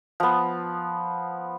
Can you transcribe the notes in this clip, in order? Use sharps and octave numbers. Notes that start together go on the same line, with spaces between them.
F3 B3